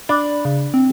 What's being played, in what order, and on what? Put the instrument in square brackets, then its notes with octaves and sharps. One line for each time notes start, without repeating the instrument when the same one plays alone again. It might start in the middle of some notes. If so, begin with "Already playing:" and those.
[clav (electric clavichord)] D4 [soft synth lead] B5
[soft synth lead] C#3
C4